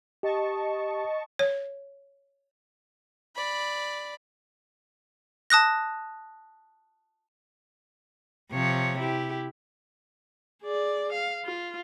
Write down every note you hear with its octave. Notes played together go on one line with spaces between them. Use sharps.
G4 D#5 A5 C#6
C#5
D5 B5
A5 D#6 F#6 A#6
C3 F3 C#5
E4 G4
G#4 D5
F5
F4